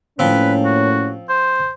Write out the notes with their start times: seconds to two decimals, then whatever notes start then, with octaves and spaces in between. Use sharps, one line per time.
0.19 A2 F3 A#3 C4 C#4 B4
0.65 F#4
1.29 C5